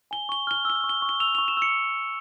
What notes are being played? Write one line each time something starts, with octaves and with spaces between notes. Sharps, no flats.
G#5 G7
C#6 G7
F6 G7
E6 G7
C#6
G7
C#6
G7
E6 F7
C#6 F7
E7
E6 C#7